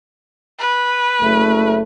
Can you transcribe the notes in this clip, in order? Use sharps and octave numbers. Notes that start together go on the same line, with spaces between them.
B4
F#1 A3